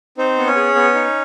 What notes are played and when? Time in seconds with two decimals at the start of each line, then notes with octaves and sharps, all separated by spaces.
0.18 C4 D#4 C5
0.38 B3
0.47 C#4 C#5
0.56 G#4
0.75 B3
0.94 D#4